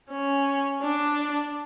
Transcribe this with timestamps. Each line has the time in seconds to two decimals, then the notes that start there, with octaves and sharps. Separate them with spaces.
0.10 C#4
0.81 D4